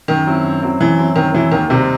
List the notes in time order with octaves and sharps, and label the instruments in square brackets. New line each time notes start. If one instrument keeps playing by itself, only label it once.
[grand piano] F#2 [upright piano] D#3
[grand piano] F#3 C4 E4
F#2
F#3 C4 E4
[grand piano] F#2 [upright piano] E3
[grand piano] F#3 C4 E4
[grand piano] F#2 [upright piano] D#3
[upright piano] E3 [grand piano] F#3 C4 E4
[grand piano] D#2 [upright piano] D#3
[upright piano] C3 [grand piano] D#3 G3 C4 D#4